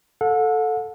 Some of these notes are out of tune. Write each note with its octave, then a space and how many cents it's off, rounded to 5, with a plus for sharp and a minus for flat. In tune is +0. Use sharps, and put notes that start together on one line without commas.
A4 +0 F#5 -40